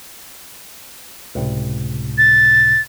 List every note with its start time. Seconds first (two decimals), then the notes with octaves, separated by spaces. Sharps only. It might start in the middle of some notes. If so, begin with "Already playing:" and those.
1.35 C#2 A2 C3
2.18 A6